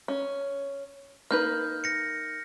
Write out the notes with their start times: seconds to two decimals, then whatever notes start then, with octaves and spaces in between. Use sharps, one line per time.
0.08 C#4
1.31 A#3 D#4 B4 F6 G6
1.84 A#6 C#7